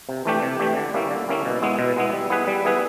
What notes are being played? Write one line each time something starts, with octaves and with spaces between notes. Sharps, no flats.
C3
E3 A3 D4 G4
C3
E3 A3 D4 G4
D3
G3 A#3 C#4 E4
D3
G3 A#3 C#4 E4
B2
G#3 B3 E4
B2
G#3 B3 E4
G3
B3 E4 G#4 B4
G3
B3 E4 G#4 B4